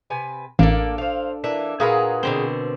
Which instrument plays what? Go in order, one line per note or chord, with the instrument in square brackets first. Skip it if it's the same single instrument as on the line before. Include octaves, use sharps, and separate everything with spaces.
[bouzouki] C3 B4 G#5
[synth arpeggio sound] A1 [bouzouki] A#3 [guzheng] D4 A4
[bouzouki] C5 F5
[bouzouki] E3 A#3 D4 [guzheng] E5
[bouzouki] A#2 G#4 F5 [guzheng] F#4 A#4 B4
[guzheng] B2 D3 C4